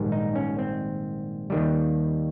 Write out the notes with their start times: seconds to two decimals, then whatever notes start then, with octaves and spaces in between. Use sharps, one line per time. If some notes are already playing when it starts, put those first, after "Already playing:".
Already playing: A#1 G#2 D#3 G3
0.12 D#4
0.36 C#4
0.59 C4
1.50 D#2 D#3 G3